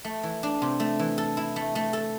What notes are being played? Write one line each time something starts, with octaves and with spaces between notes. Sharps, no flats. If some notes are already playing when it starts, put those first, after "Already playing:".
A3
E3
D4
C3
A3
E3
A4
E4
A3
A3
A4